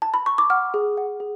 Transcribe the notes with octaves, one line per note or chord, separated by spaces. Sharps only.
A5
B5
C#6
D6
F#5 F6
G#4
F#5
G#4